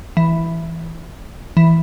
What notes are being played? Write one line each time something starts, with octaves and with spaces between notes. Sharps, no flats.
E3
E3